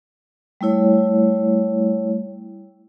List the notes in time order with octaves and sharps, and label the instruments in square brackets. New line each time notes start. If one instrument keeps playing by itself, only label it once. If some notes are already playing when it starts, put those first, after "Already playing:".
[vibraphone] G3 A3 E4 C#5